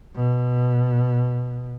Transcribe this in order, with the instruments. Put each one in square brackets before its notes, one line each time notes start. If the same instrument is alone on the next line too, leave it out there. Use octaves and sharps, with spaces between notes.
[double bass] B2